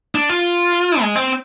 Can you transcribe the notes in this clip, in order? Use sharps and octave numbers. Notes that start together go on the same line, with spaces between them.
D4
F4
G#3
C4